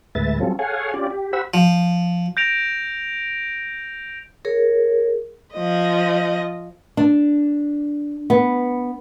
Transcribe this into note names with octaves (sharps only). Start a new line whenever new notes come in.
D2 A2 G#3 B4 E5 A6
F#3 G3 C4 C#4 F4 A4
G#4 A4 C#5 F5 F#5 G#5
C#4 F4 G4 D5
G4
G4 C5 F#5 B5 E6
F3
G6 A#6 D7 F7
G#4 A#4 C#5
F3 D#5
D4
B3